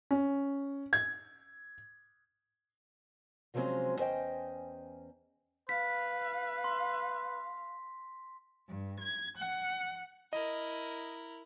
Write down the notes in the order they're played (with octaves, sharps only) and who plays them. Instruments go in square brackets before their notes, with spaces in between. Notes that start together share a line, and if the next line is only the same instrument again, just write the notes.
[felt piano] C#4
G#6
[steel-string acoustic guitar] C3 F3 F#3 G#3 C4 C#4
E2 C#4 C5 D#5 G5
[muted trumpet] B4 [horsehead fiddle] F5 [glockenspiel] B6
[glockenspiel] C6
[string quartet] G2
G#6
F#5
[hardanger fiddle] E4 A#4 [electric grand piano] D#5